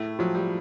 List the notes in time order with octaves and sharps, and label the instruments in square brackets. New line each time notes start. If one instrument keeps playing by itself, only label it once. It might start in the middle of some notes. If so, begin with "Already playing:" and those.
Already playing: [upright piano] A2 [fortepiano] A3
[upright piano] F3 [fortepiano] F#3
[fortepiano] G3